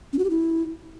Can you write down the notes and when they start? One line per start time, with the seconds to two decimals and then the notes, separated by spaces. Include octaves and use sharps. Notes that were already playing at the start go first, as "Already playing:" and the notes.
0.13 C#4
0.19 F#4
0.24 G4
0.30 E4